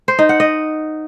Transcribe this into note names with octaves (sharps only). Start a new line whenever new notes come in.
C5
D#4
F#5
D#5